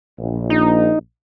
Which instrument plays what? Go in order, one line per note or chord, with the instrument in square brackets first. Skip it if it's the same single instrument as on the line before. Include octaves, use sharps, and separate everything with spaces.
[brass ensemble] A#1
[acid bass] D#4